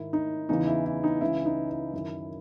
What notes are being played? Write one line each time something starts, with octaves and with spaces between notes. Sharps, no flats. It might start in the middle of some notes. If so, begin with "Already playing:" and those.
Already playing: G#2 D#3 E4
D#4
E2 C#3 E3 D#4
E4
E4
D#4
C#2 C#3 E3 E4
D#4
E4
F#2 D#3 E4